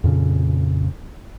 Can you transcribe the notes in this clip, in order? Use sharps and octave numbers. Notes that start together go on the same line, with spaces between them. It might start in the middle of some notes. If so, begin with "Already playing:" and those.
F2 A#2 C#3